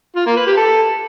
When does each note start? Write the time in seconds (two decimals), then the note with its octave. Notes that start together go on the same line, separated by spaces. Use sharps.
0.16 F4
0.26 A#3
0.36 B4
0.47 G4
0.57 A4